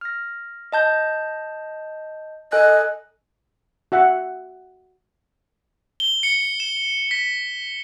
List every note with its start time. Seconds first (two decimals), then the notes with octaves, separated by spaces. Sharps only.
0.01 F6 A#6
0.73 D#5 A5 G6
2.52 A4 D#5 G#5 F#6
3.92 F#4 E5 F#5
6.00 G7
6.23 C#7
6.60 E7
7.11 B6